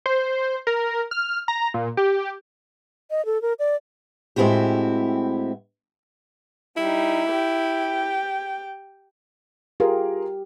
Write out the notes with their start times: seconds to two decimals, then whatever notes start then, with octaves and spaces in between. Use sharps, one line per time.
0.06 C5
0.67 A#4
1.11 F6
1.48 A#5
1.74 A#2
1.97 G4
3.11 D#5
3.26 A4
3.42 A#4
3.59 D5
4.36 A2 G#3 C4 E4 F#4 G4
6.77 G3 D#4 E4
7.29 G4 G5
9.80 F4 G4 G#4 A#4